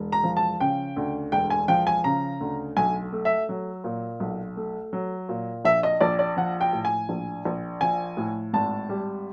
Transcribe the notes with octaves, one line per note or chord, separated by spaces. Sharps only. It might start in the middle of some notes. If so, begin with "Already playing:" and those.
Already playing: E1
A#5
F3
A5
C#3 G5
D2
E1 G5
G#5
F3 G5
G#5
C#3 A#5
D2
B1 G#5
A3
E5
F#3
A#2
B1
A3
F#3
A#2
A#1 E5
D#5
A#1 D5
D5
F3 F#5
G5
A2
G#5
A#1
A#1
F3 G#5
A2
G#1 A5
G3